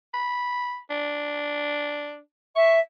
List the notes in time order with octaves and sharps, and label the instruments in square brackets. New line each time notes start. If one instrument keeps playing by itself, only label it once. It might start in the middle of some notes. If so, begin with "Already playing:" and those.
[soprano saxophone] B5
D4
[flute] E5 [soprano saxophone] C#6